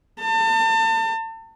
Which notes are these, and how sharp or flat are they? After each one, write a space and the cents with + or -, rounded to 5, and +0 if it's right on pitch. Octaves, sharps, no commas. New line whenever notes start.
A5 +35